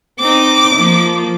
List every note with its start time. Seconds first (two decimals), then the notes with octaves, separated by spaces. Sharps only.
0.19 C4 D#4 D6
0.75 F3 A#3